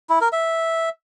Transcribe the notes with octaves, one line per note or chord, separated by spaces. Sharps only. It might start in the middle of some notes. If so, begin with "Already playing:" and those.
E4
A#4
E5